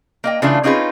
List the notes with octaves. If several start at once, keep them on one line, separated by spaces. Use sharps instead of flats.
A#3 D#5 G5
C#3 E3 A3 D4 F4 A4
C4 C#4 D#4 F4 G#4 B4